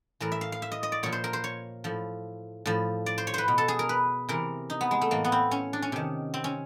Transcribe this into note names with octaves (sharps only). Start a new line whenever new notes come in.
A2 E3 A#4
E5
F5
F5
E5
D#5
D#5
D5
A#2 F3 C#5
C5
A#4
C5
C#5
A2 F3
A2 F3
D5
C5
C#5
B4 C5
B2
A4
G#4
A#4
B4
C3 E3 A#4
D#4
B3
G#3
A3
A2 E3 A#3
B3
C4
C#4
D4
C#4
C3 D#3
C4
C#4